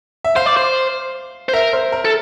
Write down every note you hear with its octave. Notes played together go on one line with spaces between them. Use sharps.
E5
C5 F5
D5
C5
C5
A#4 E5
C5
A#4
A4